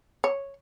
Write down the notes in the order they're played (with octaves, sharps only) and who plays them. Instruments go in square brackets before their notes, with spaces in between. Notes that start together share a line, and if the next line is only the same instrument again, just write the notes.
[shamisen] C#5